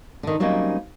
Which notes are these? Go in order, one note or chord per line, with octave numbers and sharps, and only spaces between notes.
D3 D#3
F#3 G3 A#3 C4 C#4 D#4